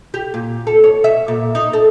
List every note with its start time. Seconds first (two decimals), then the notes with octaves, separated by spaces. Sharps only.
0.14 G4
0.34 A#2
0.67 A4
0.84 C#5
1.04 E5
1.28 A#2
1.55 D#4
1.73 A4